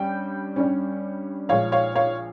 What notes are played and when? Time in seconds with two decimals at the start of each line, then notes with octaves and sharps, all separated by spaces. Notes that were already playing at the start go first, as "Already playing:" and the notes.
Already playing: G2 G3 C#4 G5
0.56 G2 G3 C#4
1.49 A#1 A#2 G#3 C#5 F5
1.72 C#5 F5
1.96 C#5 F5